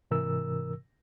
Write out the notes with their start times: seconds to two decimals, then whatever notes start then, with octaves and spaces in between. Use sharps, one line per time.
0.11 G#2 C3 E3 A#4 E6